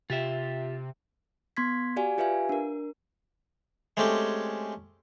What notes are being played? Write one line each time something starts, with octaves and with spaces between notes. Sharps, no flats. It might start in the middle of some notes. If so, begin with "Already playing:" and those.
C3 F4 G4 E5
B3 C6 G#6 B6
F#4 G4 D5 F5 G#5
F4 G4 B4 E5 F5 G#5
D4 A#4
G#3 A3 C4 C#4 G4